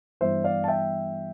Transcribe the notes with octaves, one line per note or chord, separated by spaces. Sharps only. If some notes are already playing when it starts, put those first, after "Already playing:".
G2 E3 G3 B3 C5 E5
D5 F5
A5
E5 G5